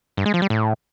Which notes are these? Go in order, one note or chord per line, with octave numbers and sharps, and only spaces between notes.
G2
G#3
F3
G3
A2